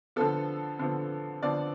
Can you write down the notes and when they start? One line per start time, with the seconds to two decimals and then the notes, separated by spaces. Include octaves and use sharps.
0.16 D3 F3 B3 A4
0.79 D3 F3 B3
1.43 D3 F3 B3 D5